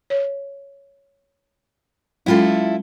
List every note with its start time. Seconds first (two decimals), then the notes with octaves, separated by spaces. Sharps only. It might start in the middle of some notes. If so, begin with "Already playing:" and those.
0.10 C#5
2.26 F#3 G#3 C#4 E4 F4 A4